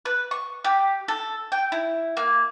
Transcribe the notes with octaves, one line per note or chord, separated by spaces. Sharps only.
B4
C#6
G4
A4
G5
E4
A#3